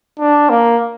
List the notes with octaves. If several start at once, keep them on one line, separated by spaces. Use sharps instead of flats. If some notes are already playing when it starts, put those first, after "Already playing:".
D4
A#3